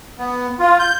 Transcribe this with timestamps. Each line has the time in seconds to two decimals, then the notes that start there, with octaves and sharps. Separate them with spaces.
0.19 B3
0.59 F4
0.79 G6